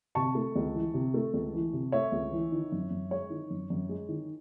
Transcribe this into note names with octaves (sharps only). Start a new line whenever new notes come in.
C3 A5 C#6
A3
C#2
E3
C3
A3
C#2
E3
C3
A3 C#5 E5
C#2
E3
D#3
F#2
F#2
G#3 C#5
D#3
F#2
F#2
G#3
D#3